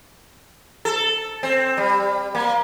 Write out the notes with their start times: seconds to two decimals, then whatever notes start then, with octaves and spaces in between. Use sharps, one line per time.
0.85 A4
1.43 C4
1.77 G3
2.35 A#3